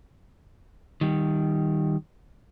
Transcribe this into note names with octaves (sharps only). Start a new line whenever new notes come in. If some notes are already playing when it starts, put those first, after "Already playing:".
D#3 G3